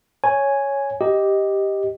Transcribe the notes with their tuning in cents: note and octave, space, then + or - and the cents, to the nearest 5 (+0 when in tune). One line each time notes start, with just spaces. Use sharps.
C#5 +0 G#5 +0
G4 +0 D#5 +5